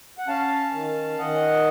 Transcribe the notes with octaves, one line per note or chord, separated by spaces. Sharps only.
F#5
C#4 F5 A5
D#3
D#3 D#5 F#5